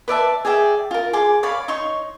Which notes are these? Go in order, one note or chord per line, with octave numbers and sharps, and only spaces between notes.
B4 D5 E5 A5
G#4 D5 E5 G5
F4 A#4
G#4 C6 D6
C#5 D5 F5 B5
D#4 C#5 C6 C#6